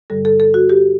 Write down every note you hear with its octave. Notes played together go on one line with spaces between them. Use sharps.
G2 D3 G3 A4
A4
A4
F#4
G4